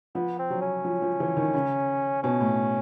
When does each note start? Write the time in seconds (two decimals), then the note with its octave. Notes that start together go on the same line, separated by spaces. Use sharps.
0.15 F3 B3
0.39 C4
0.50 F#3
0.61 C#4
0.85 F3
1.02 F3
1.20 E3
1.37 D#3
1.53 C#3
2.23 B2 C#4
2.41 A2